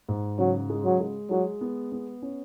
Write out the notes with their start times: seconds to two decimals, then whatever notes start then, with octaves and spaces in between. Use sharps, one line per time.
0.09 G#2
0.39 C#3 F#3
0.70 G#3
0.85 F#3
1.00 G#3
1.30 F#3 G#3
1.61 B3
1.92 B3
2.22 C#4